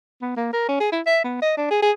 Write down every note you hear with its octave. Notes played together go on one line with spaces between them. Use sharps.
B3
A#3
A#4
C#4
G#4
E4
E5
B3
D#5
D4
G#4
G#4